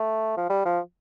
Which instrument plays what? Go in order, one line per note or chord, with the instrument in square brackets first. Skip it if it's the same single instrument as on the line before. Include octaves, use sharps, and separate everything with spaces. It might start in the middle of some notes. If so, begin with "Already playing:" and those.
Already playing: [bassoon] A3
F3
G3
F3